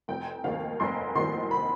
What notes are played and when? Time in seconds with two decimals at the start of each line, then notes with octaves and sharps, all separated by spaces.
0.08 F1 G5
0.44 D#2 D#3 F5
0.80 F1 C6
1.15 D#2 D#3 C6
1.51 B5